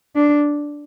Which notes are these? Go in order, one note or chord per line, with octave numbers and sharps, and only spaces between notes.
D4